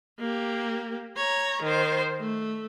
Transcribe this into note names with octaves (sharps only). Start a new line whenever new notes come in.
A#3 G4
C#5 A#5
D#3 C5
A3